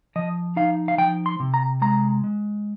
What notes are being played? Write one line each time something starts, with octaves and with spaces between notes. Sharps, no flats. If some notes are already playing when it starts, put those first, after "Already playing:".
F3 D#5
D#4 F5
F5
F3 G5
C6
C3
A#5
G#3 A#5
G#3